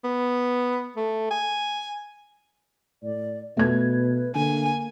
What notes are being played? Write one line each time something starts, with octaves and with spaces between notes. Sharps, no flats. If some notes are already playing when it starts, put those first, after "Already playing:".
B3
A3
G#5
A2 D5
B2 A3 B4 G#6
D3 A#3 G#5